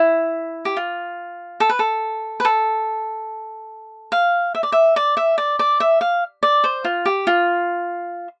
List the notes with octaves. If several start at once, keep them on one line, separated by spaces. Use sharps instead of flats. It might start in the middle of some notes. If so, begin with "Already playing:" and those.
Already playing: E4
G4
F4
A4
B4
A4
B4
A4
F5
E5
D5
E5
D5
E5
D5
D5
E5
F5
D5
C5
F4
G4
F4